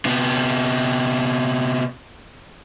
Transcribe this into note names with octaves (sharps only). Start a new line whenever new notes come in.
C3 B3